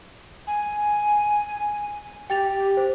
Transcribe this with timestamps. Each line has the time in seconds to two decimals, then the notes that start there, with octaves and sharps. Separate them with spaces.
0.47 G#5
2.30 G4 G5 A6 F7
2.77 C5